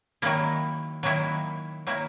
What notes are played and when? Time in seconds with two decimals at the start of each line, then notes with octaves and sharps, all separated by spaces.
0.22 D#3 F#3 A#3 E4
1.03 D#3 F#3 A#3 E4
1.87 D#3 F#3 A#3 E4